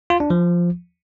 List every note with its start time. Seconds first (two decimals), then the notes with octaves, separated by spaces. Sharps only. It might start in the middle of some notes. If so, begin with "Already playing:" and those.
0.10 F4
0.20 D4
0.30 F3